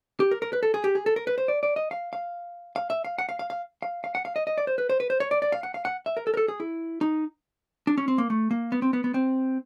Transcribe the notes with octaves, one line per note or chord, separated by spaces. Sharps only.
G4
A#4
A#4
B4
A4
G#4
G4
G#4
A4
A#4
B4
C5
D5
D5
D#5
F5
F5
F5
E5
F5
F#5
F5
F5
F5
F5
F5
F#5
F5
D#5
D#5
D5
C5
B4
C5
B4
C5
C#5
D5
D5
F5
F#5
F5
F#5
E5
A#4
A4
A#4
A4
G#4
E4
D#4
D4
C#4
C4
A#3
A3
A#3
B3
C4
B3
B3
C4